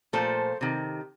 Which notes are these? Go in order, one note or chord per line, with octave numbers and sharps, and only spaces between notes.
A#2 F3 A3 A4 C5
C3 D#3